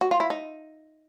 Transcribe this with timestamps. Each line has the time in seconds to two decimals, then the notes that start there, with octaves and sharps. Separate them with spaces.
0.01 F#4
0.11 F4
0.20 E4
0.30 D#4